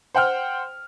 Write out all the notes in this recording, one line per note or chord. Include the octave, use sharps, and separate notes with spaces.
C5 F#5 G5 F6